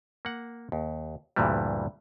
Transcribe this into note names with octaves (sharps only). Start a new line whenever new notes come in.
A#3 F#5
D#2
D2 G2 A#2 E3 G3